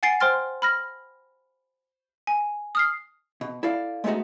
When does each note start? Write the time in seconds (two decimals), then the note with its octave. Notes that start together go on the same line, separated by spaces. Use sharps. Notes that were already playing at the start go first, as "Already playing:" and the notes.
0.03 F#5 G#5 A6 C7 D7
0.20 C5 G5 C6 F6 A6
0.62 B5 F6 A#6
2.27 G#5
2.75 D#6 F6 C7
3.41 B2
3.63 E4 A4 D5 F5
4.04 G#3 A3 B3 C#4 D#4 F#4